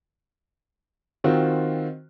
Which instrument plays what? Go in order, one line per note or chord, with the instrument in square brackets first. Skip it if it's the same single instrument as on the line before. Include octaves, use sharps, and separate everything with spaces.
[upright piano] D#3 C4 F4 F#4